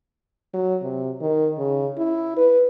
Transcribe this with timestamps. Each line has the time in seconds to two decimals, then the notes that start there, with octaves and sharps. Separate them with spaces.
0.54 F#3
0.82 C3
1.21 D#3
1.58 C#3
1.97 E4
2.37 B4